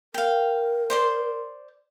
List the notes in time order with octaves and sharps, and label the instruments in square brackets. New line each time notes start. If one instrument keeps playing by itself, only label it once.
[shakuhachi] A#4 [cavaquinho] F5 G5
[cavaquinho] C5 D5 C6